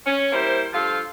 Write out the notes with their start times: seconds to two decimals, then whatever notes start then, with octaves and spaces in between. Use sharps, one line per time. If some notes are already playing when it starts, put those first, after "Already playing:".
0.06 C#4
0.33 G3 A#3 E4 C5
0.73 G2 F3 F4 A4 F5